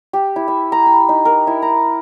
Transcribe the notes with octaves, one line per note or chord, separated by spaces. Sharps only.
G4
E4
E5
A#5
B5
D#4
A#4
E4
A#5